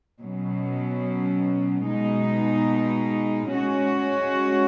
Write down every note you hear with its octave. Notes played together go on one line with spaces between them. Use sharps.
B2 F#3 C#4
B2 G#3 D#4
G#3 C#4 F#4